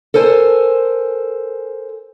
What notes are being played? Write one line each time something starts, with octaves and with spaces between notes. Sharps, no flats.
A4 A#4 C5 G#5